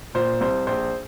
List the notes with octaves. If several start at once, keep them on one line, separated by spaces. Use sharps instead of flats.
A#2 C5
C2 C5
A#1 C5